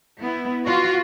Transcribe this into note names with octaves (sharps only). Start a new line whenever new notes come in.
B3 E4
F4 F#4